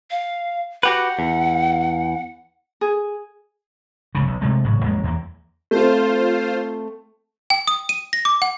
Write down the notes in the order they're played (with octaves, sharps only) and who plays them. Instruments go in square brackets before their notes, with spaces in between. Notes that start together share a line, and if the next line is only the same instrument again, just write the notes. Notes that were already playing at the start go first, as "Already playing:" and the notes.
[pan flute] F5
[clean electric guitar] F#4 G4 B4 [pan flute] F#5
[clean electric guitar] E2
[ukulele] G#4
[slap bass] F1 C#2 C#3
B1
C3 G#3 A3
G#1 A2 C#3 F#3
A1 F2 G#3 A#3
E2 E3 A#3
[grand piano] A3 C4 [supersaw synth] F4 C5
[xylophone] G5
D#6
D#7
A#6
D6
F#5